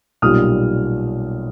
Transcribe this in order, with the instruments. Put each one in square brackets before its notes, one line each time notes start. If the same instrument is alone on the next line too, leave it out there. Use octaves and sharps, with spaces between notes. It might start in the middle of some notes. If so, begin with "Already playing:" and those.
[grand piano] B1 A#2 G3 D#6 F6